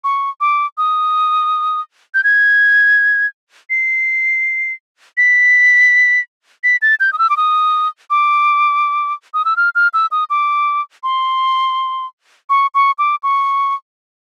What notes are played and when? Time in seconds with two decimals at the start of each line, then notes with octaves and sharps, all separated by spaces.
0.04 C#6
0.41 D6
0.78 D#6
2.14 G6
2.24 G#6
3.70 C7
5.18 B6
6.64 B6
6.82 A6
7.00 G6
7.13 D#6
7.19 E6
7.30 D6
7.37 D#6
8.10 D6
9.34 D#6
9.45 E6
9.57 F6
9.75 F6
9.94 E6
10.11 D#6
10.30 D6
11.03 C6
12.50 C#6
12.74 C#6
12.98 D6
13.23 C#6